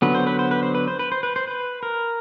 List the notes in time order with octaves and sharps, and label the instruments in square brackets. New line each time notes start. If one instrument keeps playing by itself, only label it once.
[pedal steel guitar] D3 F#3 B3 B4
C5
B4
C5
B4
C5
B4
C5
B4
C5
B4
C5
B4
A#4